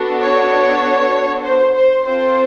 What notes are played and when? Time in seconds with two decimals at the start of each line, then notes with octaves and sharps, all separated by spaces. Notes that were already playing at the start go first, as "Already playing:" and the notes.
Already playing: B3 D4 F#4 A4
0.22 C#5
1.43 C5
1.74 C5
2.04 C4 F4 A4 C5